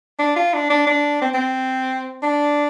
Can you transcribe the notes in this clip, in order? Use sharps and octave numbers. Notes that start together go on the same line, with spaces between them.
D4
F4
D4
D4
D4
C4
C4
D4